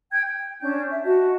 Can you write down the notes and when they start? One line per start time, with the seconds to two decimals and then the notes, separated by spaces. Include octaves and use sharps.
0.12 G5 G6 G#6
0.25 G5
0.61 C#4 D4 G6
0.91 E5
1.05 F#4 D#5 A5